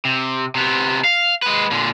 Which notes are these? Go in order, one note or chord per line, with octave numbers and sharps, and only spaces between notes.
C3
C3 B3
F5
G#3 B4
A#2 D3